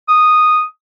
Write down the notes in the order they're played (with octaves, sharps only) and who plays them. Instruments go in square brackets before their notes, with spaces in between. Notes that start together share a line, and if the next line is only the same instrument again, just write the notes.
[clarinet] D#6